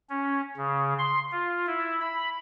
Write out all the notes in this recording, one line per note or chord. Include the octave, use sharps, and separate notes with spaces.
C#4
C#3
C6
F4
E4
B5